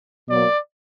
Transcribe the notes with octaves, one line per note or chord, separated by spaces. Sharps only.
B2 F#3 A#3 D5